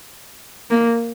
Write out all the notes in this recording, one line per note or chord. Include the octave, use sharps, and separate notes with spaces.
A#3